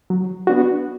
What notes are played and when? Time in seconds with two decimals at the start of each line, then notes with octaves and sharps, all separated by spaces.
0.10 F#3
0.47 B3 D4 F#4